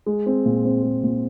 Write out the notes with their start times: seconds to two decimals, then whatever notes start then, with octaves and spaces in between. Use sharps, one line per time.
0.06 G#3
0.26 C4
0.46 A#2
0.65 C4
0.83 G#3
1.03 A#2